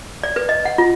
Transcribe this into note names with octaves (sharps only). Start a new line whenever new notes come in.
D5
B4
D#5
F#5
F4